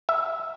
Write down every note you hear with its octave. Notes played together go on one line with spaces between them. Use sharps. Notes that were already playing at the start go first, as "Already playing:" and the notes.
E5